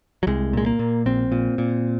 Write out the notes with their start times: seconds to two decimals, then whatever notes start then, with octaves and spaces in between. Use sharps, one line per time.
0.23 F#3
0.27 C2 G#3
0.53 A#2 G#3
0.66 A#3
0.79 A#2
1.06 A#1 C4
1.32 A#2
1.58 A#2